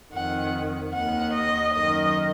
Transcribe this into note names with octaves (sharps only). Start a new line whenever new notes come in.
F2 D#3 F#5
D#2 D#3 F#5
D#5
F#2 D#3 D#5